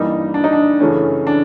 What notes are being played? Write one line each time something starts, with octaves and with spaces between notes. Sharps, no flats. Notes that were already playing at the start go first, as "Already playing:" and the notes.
Already playing: G2 E3 G3 A#3 D#4
D4
D#4
D4
F#2 C#3 E3 A3 C#4
D4